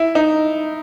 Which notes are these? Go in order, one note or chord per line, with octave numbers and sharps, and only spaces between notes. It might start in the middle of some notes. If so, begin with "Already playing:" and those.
Already playing: E4
D#4